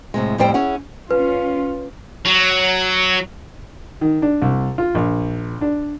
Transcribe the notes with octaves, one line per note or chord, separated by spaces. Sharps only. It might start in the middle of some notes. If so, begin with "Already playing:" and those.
A2 C3 G#3
F2 A2 G3 C5 G5
C#4 E4 G#4 F#5
C#4 F4 B4
F#3
D#3
D4
C2
F4
A#1
D4